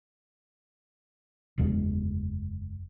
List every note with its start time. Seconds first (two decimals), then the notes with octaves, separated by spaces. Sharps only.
1.58 F#1 E2 G#3